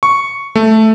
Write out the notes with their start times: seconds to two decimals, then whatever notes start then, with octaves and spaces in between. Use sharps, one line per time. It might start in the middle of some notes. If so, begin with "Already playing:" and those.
0.03 C#6
0.55 A3